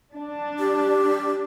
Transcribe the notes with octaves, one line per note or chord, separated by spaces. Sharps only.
D4
G4